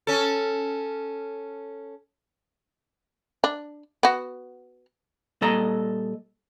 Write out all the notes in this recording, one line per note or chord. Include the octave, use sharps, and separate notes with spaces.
C#4 A4
D4
B3 F#4
A#2 G3 A4 D#5 A#5